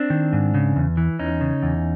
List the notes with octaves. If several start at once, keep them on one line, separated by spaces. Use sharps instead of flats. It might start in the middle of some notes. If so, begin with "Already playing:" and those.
Already playing: C4 D4
D#3
G#2
C#3
E2
E3
E2 C#4 D#4
C#3
E2